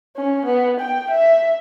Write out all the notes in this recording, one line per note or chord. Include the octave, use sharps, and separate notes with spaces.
C#4
B3
G5
E5